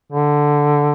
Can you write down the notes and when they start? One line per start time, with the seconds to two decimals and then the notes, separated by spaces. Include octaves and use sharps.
0.12 D3